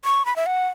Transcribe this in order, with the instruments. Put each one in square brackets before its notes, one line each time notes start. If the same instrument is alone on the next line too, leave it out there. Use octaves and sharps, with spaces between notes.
[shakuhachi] C#6
B5
E5
F#5